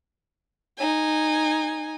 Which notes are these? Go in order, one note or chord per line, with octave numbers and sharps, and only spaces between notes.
D#4 G#5